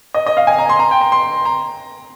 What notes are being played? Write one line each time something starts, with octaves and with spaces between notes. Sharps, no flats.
D#5
D#5
F5
G#5
A#5
C6
A#5
G5
A#5
C6
A#5